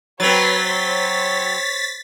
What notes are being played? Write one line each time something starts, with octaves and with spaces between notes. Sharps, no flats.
F#3 C4 B4 C#5 A6 B6
C5 C#5